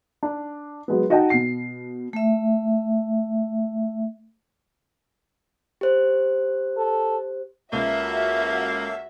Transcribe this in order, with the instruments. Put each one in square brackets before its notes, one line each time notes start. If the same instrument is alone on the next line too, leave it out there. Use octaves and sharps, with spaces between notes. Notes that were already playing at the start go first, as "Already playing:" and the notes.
[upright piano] D4
F#3 G#3 B3
D#4 F#4 D#5 F#5 G5 A5
B2 C7
[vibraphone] A3 E5
[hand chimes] G4 C5
[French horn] A4
[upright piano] C#2 [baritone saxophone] A#3 [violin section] F#4 E5 [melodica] A4 C#5 F5